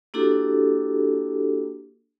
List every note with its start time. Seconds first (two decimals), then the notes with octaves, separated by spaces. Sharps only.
0.14 A#3 D4 E4 F#4 G4 A4